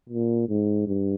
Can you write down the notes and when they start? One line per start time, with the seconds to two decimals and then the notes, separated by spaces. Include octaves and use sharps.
0.09 A#2
0.48 G#2
0.87 G2